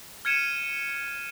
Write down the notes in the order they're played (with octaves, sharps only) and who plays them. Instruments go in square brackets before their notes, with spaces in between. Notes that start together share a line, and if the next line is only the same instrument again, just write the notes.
[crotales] F6 G#6 C#7 D#7 E7